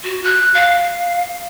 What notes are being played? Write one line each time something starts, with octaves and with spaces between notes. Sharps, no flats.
F#4
F#6
F5